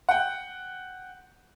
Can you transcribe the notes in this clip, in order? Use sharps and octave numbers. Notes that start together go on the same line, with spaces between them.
F#5 G5